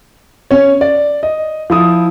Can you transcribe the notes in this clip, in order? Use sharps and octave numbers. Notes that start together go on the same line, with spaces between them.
C#4 C#5
D5
D#5
F3 E4 D#6